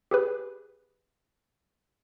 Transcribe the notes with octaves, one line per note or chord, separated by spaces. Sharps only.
G4 G#4 B4